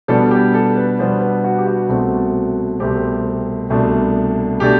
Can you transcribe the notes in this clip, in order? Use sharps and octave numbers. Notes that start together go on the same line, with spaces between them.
B2 G3 B3 D4 A4
G4
A4
B4
B2 G3 B3 D4 C5
B4
F#4
G4
F#4
C2 B2 A3 C4
C2 B2 A3 C4 G4
C2 B2 A3 D4
B2 A3 D4 G4